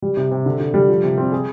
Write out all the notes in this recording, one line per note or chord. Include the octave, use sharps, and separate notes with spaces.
G3
C3
C3
D3
D3
G3
F3
C3
C4
G#4